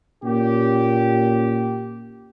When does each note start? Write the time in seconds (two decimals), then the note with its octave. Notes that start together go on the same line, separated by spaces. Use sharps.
0.24 A#2 C#4 G4